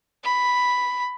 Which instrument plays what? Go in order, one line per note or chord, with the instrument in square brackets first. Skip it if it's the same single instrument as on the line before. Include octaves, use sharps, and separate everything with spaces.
[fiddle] B5